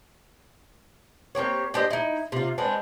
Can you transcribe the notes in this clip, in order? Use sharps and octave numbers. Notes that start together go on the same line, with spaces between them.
A#3 C4 G4 C#5
D4 G4 C5 D#5
D#4 E4
C3 F4
G#3 B3 C4 D4